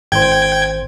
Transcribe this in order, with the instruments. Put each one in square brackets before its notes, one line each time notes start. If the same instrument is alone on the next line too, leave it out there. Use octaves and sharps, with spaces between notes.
[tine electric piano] G#1 C5 [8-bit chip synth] G5 G#6